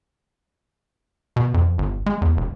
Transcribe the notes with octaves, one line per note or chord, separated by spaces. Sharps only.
B2
F2
G1
G#3
E2
E1